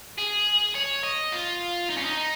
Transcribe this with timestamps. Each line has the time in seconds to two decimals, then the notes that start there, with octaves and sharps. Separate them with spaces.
0.18 G#4
0.75 C#5
1.04 D#5
1.32 F4
1.90 D#4
1.97 C#4
2.05 D#4